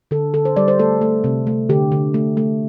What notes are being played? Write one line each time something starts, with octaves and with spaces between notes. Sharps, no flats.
D3 A4
D3 A4
C5
G3 D5
C5
A3 A4
A3
C3
A3
D3 G4
D3
A3
A3